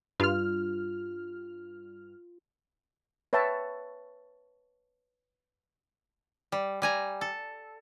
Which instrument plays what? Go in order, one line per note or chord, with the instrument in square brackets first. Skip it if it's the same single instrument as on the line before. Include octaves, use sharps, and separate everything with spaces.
[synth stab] G2 F6 [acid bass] F4
[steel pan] B4 C#5 E5 G5 A5
[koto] G3
G3 G#5 A#5
A4